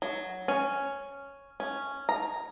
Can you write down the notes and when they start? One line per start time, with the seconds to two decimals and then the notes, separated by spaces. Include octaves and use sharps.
0.02 F#3
0.48 C#4
1.60 C#4
2.09 A#5